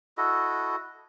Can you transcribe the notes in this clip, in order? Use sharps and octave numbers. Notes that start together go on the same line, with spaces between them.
E4 F#4 A4 D#5